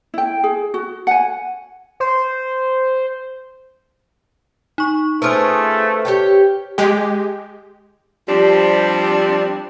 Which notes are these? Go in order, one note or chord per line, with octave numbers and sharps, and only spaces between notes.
E4 G5
G#4
F#4
F#5 G#5
C5
D#4 C#6
A3 C#4 F4 G#4 B4 C5 F6
G4 C#5 G5
G#3 G4
F3 G3 C4 D4 G4